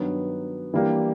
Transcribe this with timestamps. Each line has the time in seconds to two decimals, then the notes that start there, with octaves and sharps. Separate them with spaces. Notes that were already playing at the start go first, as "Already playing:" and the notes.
Already playing: G2 D#3 F#3 B3
0.74 E3 G3 A#3 D4 G4